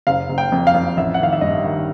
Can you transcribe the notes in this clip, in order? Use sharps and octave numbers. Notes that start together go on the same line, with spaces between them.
F#1 F5
F#1
G5
F2
F5
F2
A1 E5
F#5
D#3 F5
E5
G2 D#5
D#3